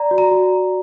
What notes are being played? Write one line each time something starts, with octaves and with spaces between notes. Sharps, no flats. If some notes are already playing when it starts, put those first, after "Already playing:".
Already playing: D5 A#5
F#4
A#5
F#4